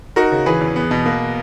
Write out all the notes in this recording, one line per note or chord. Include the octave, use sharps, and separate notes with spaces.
D#4 F#4 A#4
C#3
E3 G#4 B4
E2
B3
B2
A#3